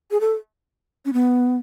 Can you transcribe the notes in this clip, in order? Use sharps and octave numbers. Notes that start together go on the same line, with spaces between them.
G#4
A4
C#4
B3